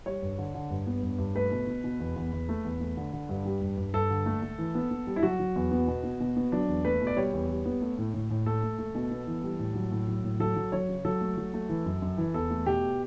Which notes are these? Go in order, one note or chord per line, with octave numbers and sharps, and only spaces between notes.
G3 C#5
G2
D3
D3
G2
B3
G2
G2
A3 B4
B2
B2
B2
E2
E2
E2
A3
E2
A3
D3
D3
G2
G3
G2
G2
G2 A4
D3
A3
A3
E3
B3
B3
G3
E4
F#3 F#4
F#3
E2
B3
B2
B3
B2
B3
F#3 D4
E2
A3 B4
B2
D5
G3 C#5
E2
G3
B3
A3
A2
A2
A2
A3 A4
A3
A3
B2
B3
E3
G3
A2
F#3
A2
F#3
A2
F#3 A4
F#3
F#3 C#5
C#3
F#3 A4
A3
F#3
A3
E3
F#2
F#2
E3
E2 A4
A3
B2 G4